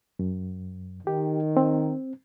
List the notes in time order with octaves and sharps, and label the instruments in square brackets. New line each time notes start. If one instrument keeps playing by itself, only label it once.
[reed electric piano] F#2
[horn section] D#3 [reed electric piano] G4
[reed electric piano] C4